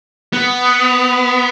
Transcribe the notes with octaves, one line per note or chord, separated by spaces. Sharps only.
B3